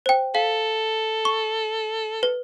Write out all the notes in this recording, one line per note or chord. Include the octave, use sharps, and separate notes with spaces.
C5 G5
A4 F5
C#6
B4